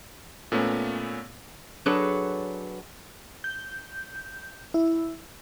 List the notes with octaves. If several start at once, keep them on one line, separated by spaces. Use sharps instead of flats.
A#2 A3 B3 C#4
F#3 D4 G#4 A4 B4 C#5
G6
E4